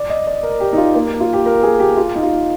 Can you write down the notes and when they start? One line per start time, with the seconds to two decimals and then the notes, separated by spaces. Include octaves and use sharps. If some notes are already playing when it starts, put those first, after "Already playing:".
Already playing: D5
0.10 D#5
0.27 D5
0.43 A#4
0.60 G4
0.73 D#4
0.77 F4
0.95 A#3
1.20 F4
1.33 G4
1.46 A#4
1.63 G#4
1.80 G4
1.97 F4
2.15 D#4
2.23 F4